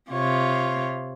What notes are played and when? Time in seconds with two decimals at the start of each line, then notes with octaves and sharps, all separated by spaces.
0.11 C3 F4 C#5